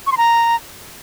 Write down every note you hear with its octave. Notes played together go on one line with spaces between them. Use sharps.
C#6
C6
A#5